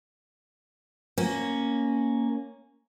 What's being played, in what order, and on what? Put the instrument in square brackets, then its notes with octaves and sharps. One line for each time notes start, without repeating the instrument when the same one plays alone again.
[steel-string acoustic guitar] A#3 C#4